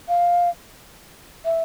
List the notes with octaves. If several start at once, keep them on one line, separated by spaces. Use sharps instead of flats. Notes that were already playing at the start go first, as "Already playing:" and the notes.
F5
E5